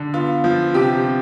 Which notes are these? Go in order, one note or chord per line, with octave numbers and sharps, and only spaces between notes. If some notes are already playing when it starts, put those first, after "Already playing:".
Already playing: D3
B3 F4
F3
C3 G4